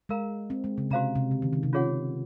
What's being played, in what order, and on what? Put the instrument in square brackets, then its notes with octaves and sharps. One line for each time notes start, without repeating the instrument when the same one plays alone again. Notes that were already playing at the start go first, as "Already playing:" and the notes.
[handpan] G#3 [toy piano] A#4 F5 A#5
[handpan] C4
G#3
C#3
[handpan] C3 [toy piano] F#4 C5 F5 A#5
[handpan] C3
C#3
D#3
D#3
C3
[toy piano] C#4 F4 G#4 C#5 F#5